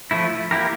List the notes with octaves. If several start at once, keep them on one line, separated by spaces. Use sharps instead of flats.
F3 A3 E4
A#3 E4 G4 A#4